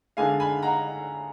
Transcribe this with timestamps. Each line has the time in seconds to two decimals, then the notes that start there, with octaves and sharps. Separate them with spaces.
0.17 D3 G#3 B3 D4 F5 G#5
0.40 G#5 B5
0.63 F#5 A#5